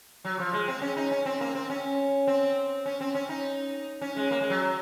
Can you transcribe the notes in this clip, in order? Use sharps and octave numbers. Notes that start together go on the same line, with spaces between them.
F#3
F3
G#3
C4
C#4
D#4
C#4
C4
A#3
C4
C#4
C4
C#4
C4
C#4
D#4
C#4
G#3
A#3
G#3
F#3